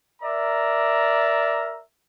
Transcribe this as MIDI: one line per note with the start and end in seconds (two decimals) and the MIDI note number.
0.22 1.80 70
0.22 1.80 74
0.22 1.80 76
0.22 1.80 82